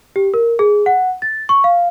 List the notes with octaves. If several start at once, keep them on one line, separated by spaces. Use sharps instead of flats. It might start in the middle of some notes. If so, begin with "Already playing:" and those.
G4
A#4
G#4
F#5
A6
C#6
F5